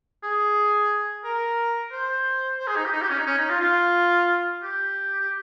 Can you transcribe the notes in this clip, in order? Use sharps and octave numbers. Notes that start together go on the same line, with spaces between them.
G#4
A#4
C5
C5
G#4
D#4
G4
D#4
G4
C#4
D#4
C#4
D#4
F4
F4
G4
G4